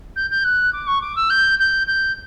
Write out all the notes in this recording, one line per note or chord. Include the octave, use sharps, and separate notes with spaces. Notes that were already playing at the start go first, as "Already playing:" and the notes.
G6
G6
F#6
D6
C#6
D6
E6
G6
G6
G6